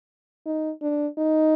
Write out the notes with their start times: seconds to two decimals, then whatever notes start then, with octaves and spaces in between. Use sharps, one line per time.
0.46 D#4
0.82 D4
1.18 D#4